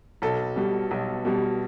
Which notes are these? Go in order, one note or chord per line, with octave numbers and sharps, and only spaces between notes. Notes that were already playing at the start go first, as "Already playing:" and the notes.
B1 A4
B2 G3
B1
B2 G3